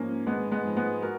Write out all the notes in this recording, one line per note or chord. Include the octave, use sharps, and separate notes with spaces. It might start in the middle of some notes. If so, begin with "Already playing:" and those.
Already playing: G#2 F3 A#3 C#4
G#1 G#3 B3
G#3 B3
G#2 F3
G#3 B3
F#4 A#4